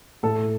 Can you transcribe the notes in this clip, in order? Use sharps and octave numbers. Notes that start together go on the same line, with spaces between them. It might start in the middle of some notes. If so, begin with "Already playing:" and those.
A2 A4